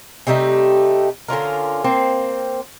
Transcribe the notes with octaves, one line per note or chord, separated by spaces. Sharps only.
C3 G3 A3 D#4
D3 C#4 F4 A#4
A#3 C4 C5